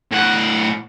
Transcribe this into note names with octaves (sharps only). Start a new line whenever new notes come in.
A2 F#5